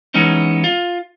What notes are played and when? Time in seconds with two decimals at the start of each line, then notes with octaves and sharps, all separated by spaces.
0.14 E3 G#3 B3 C#4 D#4
0.64 F4